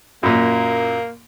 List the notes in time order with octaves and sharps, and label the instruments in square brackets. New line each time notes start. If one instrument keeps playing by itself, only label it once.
[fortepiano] F#2 A#2 [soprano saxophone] A#3